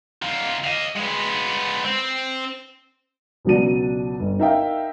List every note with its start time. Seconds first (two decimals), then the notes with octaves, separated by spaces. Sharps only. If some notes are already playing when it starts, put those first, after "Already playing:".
0.22 D#3 F4
0.64 D#5 F5
0.96 G#3 B3
1.85 C4
3.45 C#2 B2 F#3 D4 D#7
4.20 G1
4.39 D#4 A#4 E5 F5 G5